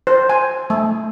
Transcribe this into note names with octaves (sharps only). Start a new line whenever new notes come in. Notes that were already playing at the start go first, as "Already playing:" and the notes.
C5
G#5
A3